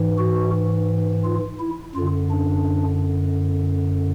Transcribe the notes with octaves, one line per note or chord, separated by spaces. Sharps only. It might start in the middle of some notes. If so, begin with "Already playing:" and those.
Already playing: G#2 E3
F#4
F4
E4
F#2 D3 F4
D4